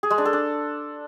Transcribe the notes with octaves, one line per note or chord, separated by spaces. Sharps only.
G#4
G#3
D4
A4
D4